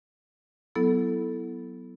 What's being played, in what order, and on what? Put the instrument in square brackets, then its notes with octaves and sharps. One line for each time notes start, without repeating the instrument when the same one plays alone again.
[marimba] F#3 B3 E4 A4